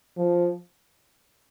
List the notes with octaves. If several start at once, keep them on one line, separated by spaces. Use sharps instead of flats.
F3